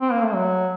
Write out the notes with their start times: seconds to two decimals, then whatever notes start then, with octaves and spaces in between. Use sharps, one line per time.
0.01 C4
0.12 A#3
0.24 A3
0.34 F#3